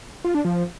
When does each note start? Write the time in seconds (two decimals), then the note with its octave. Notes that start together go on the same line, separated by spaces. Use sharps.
0.24 F4
0.35 D4
0.45 F3